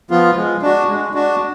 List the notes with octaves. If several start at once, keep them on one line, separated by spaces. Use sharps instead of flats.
F3 B3 F4
G#3
D4 F#4
G#3
D4 F#4